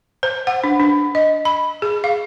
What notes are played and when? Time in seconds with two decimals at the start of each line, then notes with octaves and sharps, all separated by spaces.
0.23 C5
0.47 F#5
0.64 D4
0.80 D4
1.15 D#5
1.45 B5
1.82 G#4
2.04 F5